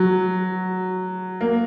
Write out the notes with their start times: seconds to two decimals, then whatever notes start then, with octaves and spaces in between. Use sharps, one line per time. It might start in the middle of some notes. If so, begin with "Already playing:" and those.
Already playing: F#3
1.41 A#3